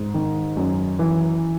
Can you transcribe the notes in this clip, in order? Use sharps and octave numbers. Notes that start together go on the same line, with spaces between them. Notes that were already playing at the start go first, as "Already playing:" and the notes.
Already playing: G#2
D#3
F#2
E3